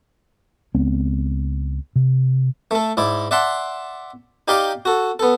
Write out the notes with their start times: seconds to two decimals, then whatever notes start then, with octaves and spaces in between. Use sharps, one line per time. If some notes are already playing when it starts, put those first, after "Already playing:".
0.75 C#2 G#3 B3 C4
1.96 C3
2.71 A3 A4
2.97 G#2 E4 D5
3.31 D5 E5 F#5 A5 C6
4.48 D#4 G4 D5 F5 G5 A#5
4.85 F#4 A4
5.19 B3 A4